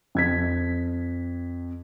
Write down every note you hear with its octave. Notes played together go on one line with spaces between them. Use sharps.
F2 G#6 B6